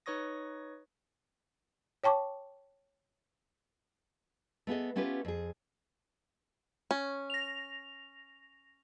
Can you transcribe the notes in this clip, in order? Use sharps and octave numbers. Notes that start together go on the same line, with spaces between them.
D#4 B4 C#5 C#6 D#6 A#6
C#5 G5 A5 C#6 D6
A3 B3 G#4 D#5
A3 B3 C#4 F4 G4 B4
F2 G#4
C#4
A#6 F7